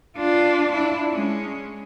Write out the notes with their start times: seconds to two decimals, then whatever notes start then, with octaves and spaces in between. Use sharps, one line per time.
0.17 D4 F4
0.72 D4 E4
1.10 G#3 C#4